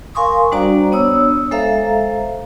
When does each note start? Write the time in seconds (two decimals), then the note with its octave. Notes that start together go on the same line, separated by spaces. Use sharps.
0.15 A#4 F5 G#5 C6 C#6 D#6
0.52 G3 D4 F#4 C5 D5 A#5
0.92 B3 D4 C#5 D#6 E6
1.51 G#3 A4 C5 E5 F5 A#5